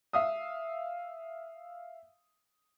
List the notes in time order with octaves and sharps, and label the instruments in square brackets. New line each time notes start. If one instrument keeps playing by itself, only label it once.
[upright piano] E5 F5 D#6